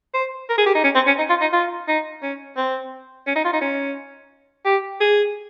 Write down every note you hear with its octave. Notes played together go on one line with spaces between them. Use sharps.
C5
A#4
G#4
G4
D#4
C#4
C4
C#4
D#4
F4
D#4
F4
D#4
C#4
C4
C#4
D#4
F4
D#4
C#4
G4
G#4